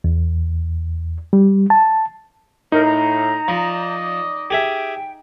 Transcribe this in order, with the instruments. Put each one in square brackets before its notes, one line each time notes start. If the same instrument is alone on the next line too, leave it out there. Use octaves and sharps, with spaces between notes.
[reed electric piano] E2
G3
A5
[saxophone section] A2 [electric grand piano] D#4 [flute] A#4
[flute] A#5
[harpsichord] F3 [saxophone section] D5 D#5
[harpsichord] G4 G#4 E5 [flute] G5